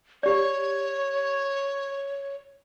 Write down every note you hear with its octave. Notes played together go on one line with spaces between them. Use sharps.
G4 C#5 D5